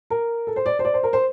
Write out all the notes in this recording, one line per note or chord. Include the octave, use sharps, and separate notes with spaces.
A#4
A4
C5
D5
C5
D5
C5
A#4
C5